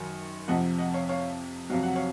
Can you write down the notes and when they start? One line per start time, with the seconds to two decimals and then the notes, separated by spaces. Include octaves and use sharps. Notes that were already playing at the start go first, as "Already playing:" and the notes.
Already playing: F#2 D#3 F#3
0.48 F2 C3 F3 D#5 F#5
0.78 D#5 F#5
0.94 C#5 F5
1.09 C#5 F5
1.70 F2 C3 F#3 F5
1.83 F#5
1.96 C#5 F5